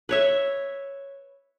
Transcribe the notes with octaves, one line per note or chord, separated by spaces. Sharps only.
B4 C#5 E5